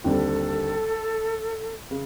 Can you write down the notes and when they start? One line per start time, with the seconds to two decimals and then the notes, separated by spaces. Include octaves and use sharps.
0.04 D#2 D3 G3 C4 A4
1.91 C#3